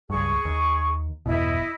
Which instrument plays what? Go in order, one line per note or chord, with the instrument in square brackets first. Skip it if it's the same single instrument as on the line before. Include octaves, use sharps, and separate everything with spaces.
[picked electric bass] C#2 G2 [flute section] G#4 C#6
[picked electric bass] D#2
[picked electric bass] G1 E2 B2 [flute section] E4 D#5